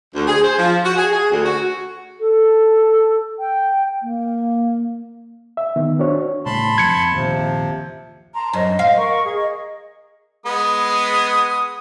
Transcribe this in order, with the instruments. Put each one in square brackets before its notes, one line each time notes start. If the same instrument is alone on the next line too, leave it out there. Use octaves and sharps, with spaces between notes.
[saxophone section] D2
G#4
C5
F3
F#4
G#4
G#4
D2
F#4
[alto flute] A4
G5
A#3
[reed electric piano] E5
D#3 B3
D4 F#4 C5 C#5
[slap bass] A2 C#3 G3 [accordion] A5 B5 C6
[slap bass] F2 [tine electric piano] G#6 C#7
[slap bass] A#1 D#2 D#3 [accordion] C3 F3
[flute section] A5 A#5 C6
[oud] F#2 [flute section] C5 D#5
[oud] F5
[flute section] A#4 C#6
G#4
D#5
[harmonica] G#3 B3 D#6